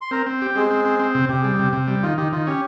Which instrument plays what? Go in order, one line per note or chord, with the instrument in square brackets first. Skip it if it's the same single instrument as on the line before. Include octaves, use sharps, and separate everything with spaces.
[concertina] C6
[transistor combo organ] C4 [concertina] A#4 A#5
[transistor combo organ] C4
G4
[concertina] G#3 G#4 [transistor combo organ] C4
[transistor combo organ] C4
C4
C4
C3
[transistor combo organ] C3 [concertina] G4
[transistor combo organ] G3 [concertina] G#4
[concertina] G4
[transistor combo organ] C3
C3
G3
[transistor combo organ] D#3 [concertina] F4
[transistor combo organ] D#3 [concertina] G4
[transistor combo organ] D#3 [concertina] F4
[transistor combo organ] C#4 [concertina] G4